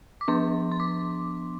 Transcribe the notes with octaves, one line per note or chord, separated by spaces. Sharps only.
D6
F3 B3 D4 C6
C6
D6